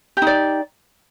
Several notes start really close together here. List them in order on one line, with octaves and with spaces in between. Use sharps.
G4 D#4 D5